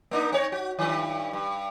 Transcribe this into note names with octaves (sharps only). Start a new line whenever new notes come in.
A#3 D4 D#4
C4 C#5
F#4
G2 D#3
G2